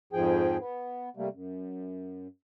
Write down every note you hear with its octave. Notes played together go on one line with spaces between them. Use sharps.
F2 G#2 F3 G#4 G5
B3
C3 G3 A3 A#3
F#2